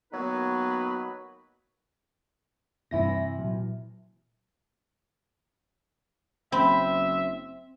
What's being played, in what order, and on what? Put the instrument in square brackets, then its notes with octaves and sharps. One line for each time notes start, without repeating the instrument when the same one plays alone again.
[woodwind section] D#3 F#3 A#3 B3 D#4 B4
[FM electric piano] G2 E5 A#6 [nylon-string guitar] C3 E3 E4
[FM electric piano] A#2 F#3
[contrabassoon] F#1 [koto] C4 [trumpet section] E5 [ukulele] B5